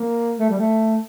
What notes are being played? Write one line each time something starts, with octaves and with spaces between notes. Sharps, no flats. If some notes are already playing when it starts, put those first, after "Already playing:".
Already playing: A#3
A3
G3
A3